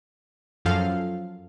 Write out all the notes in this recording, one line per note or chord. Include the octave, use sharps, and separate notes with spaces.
F#2 F3 A4 F5